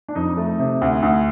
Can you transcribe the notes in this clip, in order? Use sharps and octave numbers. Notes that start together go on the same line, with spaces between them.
D4
F2 D#4
A3
C3
D2
D2